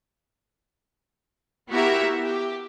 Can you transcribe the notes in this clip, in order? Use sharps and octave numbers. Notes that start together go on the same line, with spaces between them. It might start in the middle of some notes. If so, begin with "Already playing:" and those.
B3 E4 F#4 G4 A#4 E5
G4